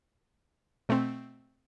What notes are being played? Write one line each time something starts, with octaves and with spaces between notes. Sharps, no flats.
B2 A3 C4